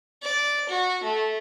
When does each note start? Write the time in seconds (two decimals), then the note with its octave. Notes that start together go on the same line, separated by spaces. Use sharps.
0.23 D5
0.69 F#4
1.03 A3